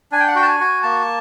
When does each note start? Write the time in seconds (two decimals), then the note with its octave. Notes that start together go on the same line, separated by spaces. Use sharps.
0.12 D4 G#5
0.20 G5
0.28 F#5
0.35 F#4 G5
0.42 A5
0.47 G#5
0.60 F#4
0.83 A#3 A5